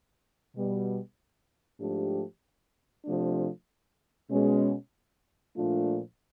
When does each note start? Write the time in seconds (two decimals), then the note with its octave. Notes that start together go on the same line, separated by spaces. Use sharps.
0.55 B2 G3 B3
1.80 G#2 F3 A3 D4 G4
3.05 C3 F3 A3 D4
4.31 B2 G#3 C#4
5.56 A#2 F3 A3 D4 F4